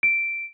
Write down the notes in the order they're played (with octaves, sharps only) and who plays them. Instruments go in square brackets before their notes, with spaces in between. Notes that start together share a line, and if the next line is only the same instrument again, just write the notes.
[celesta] D7